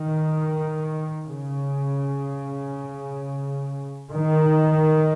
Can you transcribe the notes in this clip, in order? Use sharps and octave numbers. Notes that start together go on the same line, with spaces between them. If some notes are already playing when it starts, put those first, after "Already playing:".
Already playing: D#3
C#3
D#3